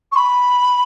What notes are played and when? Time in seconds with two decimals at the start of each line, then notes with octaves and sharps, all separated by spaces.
0.12 C#6
0.16 B5